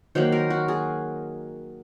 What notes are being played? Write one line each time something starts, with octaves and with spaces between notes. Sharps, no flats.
D#3 F#3 A#3 C5
A#4
F#4
G#4